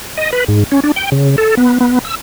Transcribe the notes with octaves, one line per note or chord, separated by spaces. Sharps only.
D#5
B4
G#2
C#4
D4
G5
C#3
A4
B3
B3
E6